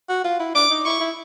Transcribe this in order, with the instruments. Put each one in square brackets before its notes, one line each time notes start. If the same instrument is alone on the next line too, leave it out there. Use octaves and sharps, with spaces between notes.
[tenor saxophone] F#4
F4
E4
[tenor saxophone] D4 [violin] D6
[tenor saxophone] D#4
[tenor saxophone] E4 [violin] C#6
[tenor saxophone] E4